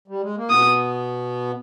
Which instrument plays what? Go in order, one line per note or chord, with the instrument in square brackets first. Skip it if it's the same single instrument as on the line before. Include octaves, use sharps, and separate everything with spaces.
[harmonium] G3
G#3
A#3
[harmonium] B2 B3 [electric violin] D#6